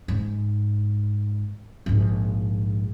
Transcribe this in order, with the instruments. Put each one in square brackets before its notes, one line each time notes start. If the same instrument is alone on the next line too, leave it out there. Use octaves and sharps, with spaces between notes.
[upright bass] G#2
A#1 G#2